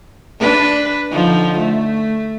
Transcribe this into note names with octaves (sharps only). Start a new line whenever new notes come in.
D4 B4
D3 F3 D#4
A3